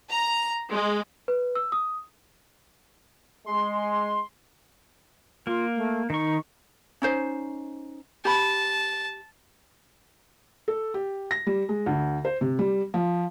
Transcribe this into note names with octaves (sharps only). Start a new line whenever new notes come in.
A#5
G#3
B4
E6
D#6
G#3 C6
A#3 F4
A3
D#3 D#4 C#6
C#4 D#4 C5
G4 A5 B5
A4
G4
A#6
G3
G#3
D2
C5
C3
G3
F3